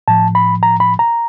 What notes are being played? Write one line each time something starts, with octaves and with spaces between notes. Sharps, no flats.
A2 F3 A5
B5
A#5
B5
A#5